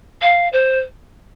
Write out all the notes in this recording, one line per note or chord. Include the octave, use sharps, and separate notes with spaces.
F5
C5